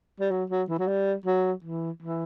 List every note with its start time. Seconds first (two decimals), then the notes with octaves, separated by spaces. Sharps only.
0.20 G3
0.31 F#3
0.50 F#3
0.69 E3
0.79 F#3
0.88 G3
1.26 F#3
1.64 E3
2.02 E3